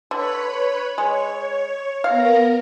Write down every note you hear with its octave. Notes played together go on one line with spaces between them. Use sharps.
D3 B4 C#5 B5
G#3 C#5
B3 A#4 F5 A#5